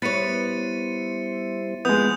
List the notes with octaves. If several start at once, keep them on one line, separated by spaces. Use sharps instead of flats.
G3 B3 E4 C5 C#5 A6 C#7 D#7
F3 G#3 B3 D#6 G6 F7